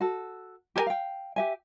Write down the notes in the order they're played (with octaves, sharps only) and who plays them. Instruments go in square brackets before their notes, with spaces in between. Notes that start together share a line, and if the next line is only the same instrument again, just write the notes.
[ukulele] F#4 A4
G4 A4 A#4 G#5
F5 G5
G4 E5 G#5